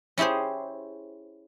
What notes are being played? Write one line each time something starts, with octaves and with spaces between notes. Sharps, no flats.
C#4 E4 G4 G#4 C5